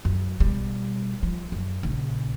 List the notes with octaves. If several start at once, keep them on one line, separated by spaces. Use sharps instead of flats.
F#2
B2 G3
F3
F#2
A#1 C#3